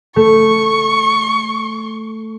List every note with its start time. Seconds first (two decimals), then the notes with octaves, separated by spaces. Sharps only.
0.16 A3 C#6